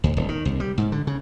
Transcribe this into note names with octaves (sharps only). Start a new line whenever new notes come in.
D2
D#1
D#3
C2
G3
G#2
D3
C#3